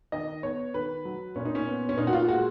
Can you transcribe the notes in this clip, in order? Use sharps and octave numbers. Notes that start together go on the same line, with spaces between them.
D#3 D#5
B3 C#5
D#3 B4
F#3
A#2 C#4
D#4
C#4
B3
C#4
A#2 D#4
F#4
F4
G#3 F#4